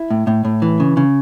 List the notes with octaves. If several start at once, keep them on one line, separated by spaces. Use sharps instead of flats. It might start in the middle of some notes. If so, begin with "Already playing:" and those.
Already playing: E4
A2
A2
A2
E3
C#3
C#3